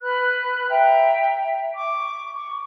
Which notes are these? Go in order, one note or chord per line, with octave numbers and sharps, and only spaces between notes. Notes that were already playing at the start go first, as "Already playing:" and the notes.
B4 B5 F6 F#6
E5 G5 A#5
C#6 D6
C#6